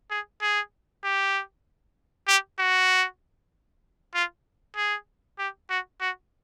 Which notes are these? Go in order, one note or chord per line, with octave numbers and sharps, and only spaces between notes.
G#4
G#4
G4
G4
F#4
F4
G#4
G4
F#4
F#4